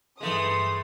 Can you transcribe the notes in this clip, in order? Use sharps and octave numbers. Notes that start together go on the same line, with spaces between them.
G2 E3 G#3 A3 C6 D#6